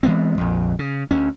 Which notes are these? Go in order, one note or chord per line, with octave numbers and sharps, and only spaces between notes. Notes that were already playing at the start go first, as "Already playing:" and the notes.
E3 G#3 B3 C4
A#1 F2
C#3
D2 C#4